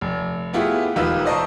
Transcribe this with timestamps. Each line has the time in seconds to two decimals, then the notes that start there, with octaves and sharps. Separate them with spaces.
0.01 F1
0.53 A3 B3 E4 F4 G4 G#4
0.96 E1 D#4 F4 G4 B4 E6
1.25 C5 D5 D#5 A5 A#5 C#6